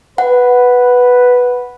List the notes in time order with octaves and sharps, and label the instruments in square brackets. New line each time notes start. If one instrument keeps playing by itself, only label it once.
[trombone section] B4 [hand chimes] F#5